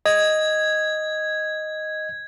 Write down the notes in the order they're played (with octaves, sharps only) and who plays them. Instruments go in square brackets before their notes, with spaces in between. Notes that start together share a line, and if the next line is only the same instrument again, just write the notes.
[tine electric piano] D#5 [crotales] G#6